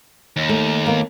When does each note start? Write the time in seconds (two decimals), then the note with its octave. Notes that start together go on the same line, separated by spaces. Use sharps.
0.36 D#2
0.49 A3
0.86 A#3 B3